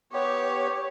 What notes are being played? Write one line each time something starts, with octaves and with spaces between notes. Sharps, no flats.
B3 G4 C#5